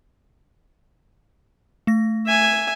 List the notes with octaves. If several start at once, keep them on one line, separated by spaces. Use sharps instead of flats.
A3 A#6
E5 G#5